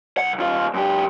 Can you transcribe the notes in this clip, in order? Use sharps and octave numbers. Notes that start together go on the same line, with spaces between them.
C2 F#5
D#2 F4
F#2 G4